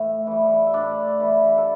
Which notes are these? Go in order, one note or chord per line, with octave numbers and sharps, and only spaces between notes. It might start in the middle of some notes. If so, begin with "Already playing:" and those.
Already playing: A2 E3 E5
E3 G3
E5
A2 D4 D5
E3 G3
A4